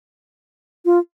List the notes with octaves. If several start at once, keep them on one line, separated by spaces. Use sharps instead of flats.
F4